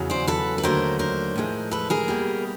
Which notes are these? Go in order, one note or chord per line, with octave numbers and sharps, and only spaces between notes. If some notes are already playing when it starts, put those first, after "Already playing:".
Already playing: E2 C#3 F#3
C5 D5
A4 B4
B4
D#2 D3 F#3 A3 A#4 C5
A#4 C5
A2 F3 G#3
A4 B4
G#4 A#4
B2 G3 A#3